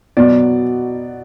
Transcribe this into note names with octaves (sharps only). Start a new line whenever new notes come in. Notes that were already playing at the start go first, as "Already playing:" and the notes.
B2 F#3 B3 D5